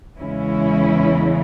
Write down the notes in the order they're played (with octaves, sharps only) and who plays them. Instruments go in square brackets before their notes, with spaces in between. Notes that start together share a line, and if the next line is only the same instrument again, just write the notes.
[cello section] E2 C#3 E3 G#3 C#4 E4